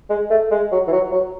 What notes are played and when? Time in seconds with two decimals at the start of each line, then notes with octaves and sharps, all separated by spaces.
0.10 G#3
0.30 A3
0.51 G#3
0.72 F#3
0.87 E3
0.92 F#3
1.12 F#3